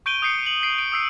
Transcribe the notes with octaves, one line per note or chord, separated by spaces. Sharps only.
C#6 G6 D7 D#7 G7
D#6 G6 C7 C#7
F#7
C7 D7
D7
D#6 E6 C7